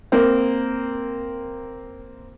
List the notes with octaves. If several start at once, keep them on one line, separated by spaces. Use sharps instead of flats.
A#3 C4